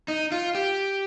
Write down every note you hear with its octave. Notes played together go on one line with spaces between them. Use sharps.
D#4
F4
G4